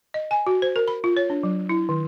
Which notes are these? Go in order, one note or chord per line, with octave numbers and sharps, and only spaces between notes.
D#5
G#5
F#4
C5
A#4
B5
F4
C#5
D4
F#3
E4
D#3